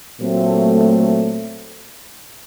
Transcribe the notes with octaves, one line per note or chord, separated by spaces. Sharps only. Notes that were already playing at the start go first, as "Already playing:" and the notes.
A#2 F#3 A3 C4